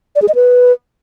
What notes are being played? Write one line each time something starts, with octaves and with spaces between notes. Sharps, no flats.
D5
G#4
D#5
B4